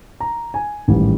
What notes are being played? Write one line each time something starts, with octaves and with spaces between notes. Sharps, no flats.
A#5
G#5
A1 G#2 D#3 G3